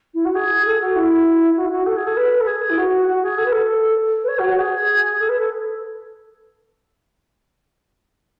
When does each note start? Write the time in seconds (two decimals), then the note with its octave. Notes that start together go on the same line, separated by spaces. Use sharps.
0.14 E4
0.25 F#4
0.35 G#4
0.66 A4
0.80 F#4
0.96 E4
1.56 F#4
1.65 E4
1.71 F#4
1.86 A4
1.96 G#4
2.07 A4
2.17 B4
2.32 B4
2.40 A4
2.47 G#4
2.70 E4
2.78 F#4
3.07 F#4
3.22 G#4
3.38 A4
3.45 B4
3.52 A4
4.24 B4
4.28 C#5
4.39 F#4
4.49 F#4
4.59 G#4
5.19 A4
5.29 B4
5.39 A4